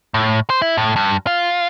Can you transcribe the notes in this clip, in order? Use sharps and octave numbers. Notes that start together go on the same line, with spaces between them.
A2
C5
E4
A2
G2
F4